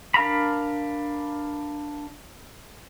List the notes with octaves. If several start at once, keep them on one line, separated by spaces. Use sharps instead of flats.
D4 A#4 F5 A#5 B5